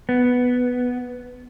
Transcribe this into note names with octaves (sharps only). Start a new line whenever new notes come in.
B3